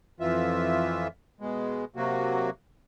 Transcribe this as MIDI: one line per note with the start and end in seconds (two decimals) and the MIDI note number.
0.20 1.08 41
0.20 1.08 52
0.20 1.08 65
0.20 1.08 76
1.41 1.85 47
1.41 1.85 56
1.96 2.50 48
1.96 2.50 54
1.96 2.50 58
1.96 2.50 66